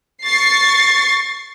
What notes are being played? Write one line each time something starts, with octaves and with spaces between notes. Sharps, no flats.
C#6 A6 C7